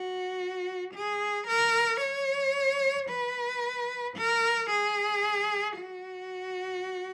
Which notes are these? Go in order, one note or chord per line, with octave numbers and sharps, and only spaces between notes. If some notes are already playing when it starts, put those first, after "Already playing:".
Already playing: F#4
G#4
A#4
C#5
B4
A#4
G#4
F#4